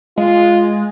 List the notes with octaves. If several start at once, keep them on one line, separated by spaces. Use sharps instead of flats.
G#3 F4